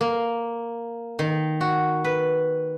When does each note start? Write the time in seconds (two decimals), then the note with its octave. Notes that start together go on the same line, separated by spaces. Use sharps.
0.01 A#3
1.19 D#3
1.61 F#4
2.04 B4